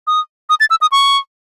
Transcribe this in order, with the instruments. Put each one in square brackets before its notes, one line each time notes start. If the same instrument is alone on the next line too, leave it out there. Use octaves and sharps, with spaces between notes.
[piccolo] D#6
D#6
A6
E6
D#6
C#6